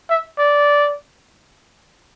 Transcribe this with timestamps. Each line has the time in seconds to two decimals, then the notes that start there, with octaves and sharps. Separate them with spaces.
0.10 E5
0.38 D5